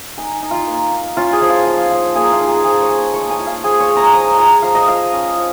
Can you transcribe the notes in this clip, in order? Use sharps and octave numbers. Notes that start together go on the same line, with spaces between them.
D#4 G#5
D#4
F4
A#3
D#4
C#4 F4
G#4
F3
F4
F3
F3
A#3 G#4
F4
D#4
G#4
F3 G#4
C#5
F3
D#6
G#3 C#6
G#5
F4
F5
F3 G#4
C#5
G#3
A#5
F3 D#6
F4 A#5
F3 F5
D#5
F3 F5
C#4
F3